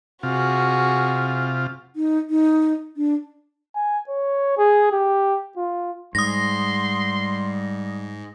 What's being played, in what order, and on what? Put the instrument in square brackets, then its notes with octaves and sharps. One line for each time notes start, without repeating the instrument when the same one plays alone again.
[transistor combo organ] C3 F4 [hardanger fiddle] F#4 G#4
[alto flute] D#4
D#4
D4
[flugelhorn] G#5
C#5
G#4
G4
F4
[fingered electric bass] G#2 [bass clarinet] G3 [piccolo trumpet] C6 [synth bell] D#6 A#6